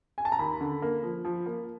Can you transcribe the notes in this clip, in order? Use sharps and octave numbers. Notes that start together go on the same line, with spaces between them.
G#5
A5
A#5
D#2 B5
D3
A#3
F3
F3
A#3